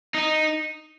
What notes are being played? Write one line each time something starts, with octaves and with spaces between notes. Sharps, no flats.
D#4